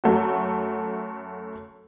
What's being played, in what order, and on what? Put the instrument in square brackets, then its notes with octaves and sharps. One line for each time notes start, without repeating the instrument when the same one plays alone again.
[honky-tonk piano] F#2 A3 F#4